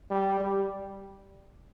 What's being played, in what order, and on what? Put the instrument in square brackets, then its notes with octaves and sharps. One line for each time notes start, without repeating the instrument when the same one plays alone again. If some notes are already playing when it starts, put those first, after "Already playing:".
[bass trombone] G3
G3